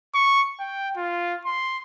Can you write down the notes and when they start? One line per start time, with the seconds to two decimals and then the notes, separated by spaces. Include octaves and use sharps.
0.14 C#6
0.60 G5
0.97 F4
1.45 C6